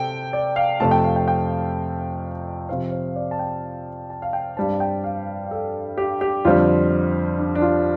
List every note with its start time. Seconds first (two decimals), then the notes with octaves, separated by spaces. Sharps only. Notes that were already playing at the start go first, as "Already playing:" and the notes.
Already playing: C3 C4 A4 G5
0.33 D5
0.56 F5
0.80 F2 C3 A3 A5
0.91 G5
1.04 F5
1.16 G5
1.28 G5
2.69 C3 F3 C4 F5
2.92 C5
3.16 D5
3.31 A5
3.39 G5
4.10 A5
4.22 F5
4.33 G5
4.57 G2 G3 C4 A5
4.80 G5
5.04 F5
5.51 A4
5.98 G4
6.21 G4
6.45 F2 D3 G3 C4 F4
7.39 D4
7.55 D4
7.62 F4